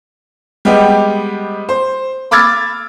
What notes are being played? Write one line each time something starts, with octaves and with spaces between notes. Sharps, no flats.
G3 G#3 B3 G4
C5
B5 D6 E6 F6 G#6 A6